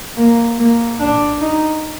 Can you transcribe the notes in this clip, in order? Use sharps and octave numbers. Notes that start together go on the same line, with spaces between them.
A#3
A#3
D4
D#4